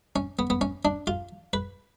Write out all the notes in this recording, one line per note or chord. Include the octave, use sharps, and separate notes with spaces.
C#4
B3
B3
C#4
D4
F4
B4